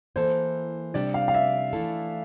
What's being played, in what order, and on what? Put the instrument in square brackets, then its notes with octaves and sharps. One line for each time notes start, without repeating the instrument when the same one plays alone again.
[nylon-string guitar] E3 A#3 E4 A4 [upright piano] C5
[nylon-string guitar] C3 G3 D4 G4 [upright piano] D5
[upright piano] F5
F5
E5
[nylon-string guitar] E3 A3 E4 A4